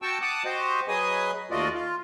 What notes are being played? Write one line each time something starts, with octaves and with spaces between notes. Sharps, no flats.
F#4 G5 A5 C#6 E6
F#5 A5 D6 D#6 F#6
F#4 G4 C5 D#5
F#3 G#4 B4 D#5 G#5 D#6
D#2 A3 F4 F#4 D5 D#5
F4